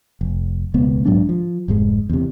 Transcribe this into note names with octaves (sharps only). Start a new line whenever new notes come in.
F1
E1 C#2 B3
A#1 G#2 F#3 D4
F3
F1 G#2 G#3
E2 C3